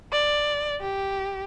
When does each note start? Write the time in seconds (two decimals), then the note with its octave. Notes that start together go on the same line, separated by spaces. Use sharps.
0.12 D5
0.81 G4